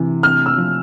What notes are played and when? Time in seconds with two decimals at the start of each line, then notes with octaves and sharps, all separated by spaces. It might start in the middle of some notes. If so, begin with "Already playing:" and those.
Already playing: C3 E3
0.23 C3 F6
0.46 E6
0.57 F3